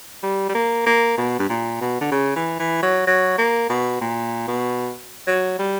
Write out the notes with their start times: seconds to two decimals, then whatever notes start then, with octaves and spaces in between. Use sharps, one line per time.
0.23 G3
0.49 G3
0.55 A#3
0.86 A#3
1.18 B2
1.39 G2
1.49 A#2
1.81 B2
2.01 D3
2.12 C#3
2.36 E3
2.60 E3
2.83 F#3
3.07 F#3
3.38 A#3
3.69 B2
4.01 A#2
4.48 B2
5.27 F#3
5.59 G3